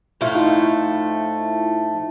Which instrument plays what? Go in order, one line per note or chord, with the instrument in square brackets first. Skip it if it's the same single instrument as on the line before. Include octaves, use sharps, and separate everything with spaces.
[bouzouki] A2 F3 A3 [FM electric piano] F4
[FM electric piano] E4
D#4 F4